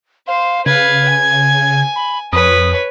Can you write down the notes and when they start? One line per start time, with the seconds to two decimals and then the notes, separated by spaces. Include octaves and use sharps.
0.28 C5 F5
0.66 C#3 B4 F5 G#6
1.09 G#5
1.96 B5
2.33 F2 B4 C#5 D#6